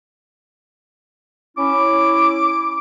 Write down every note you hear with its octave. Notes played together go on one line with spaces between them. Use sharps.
C#4 E4 D6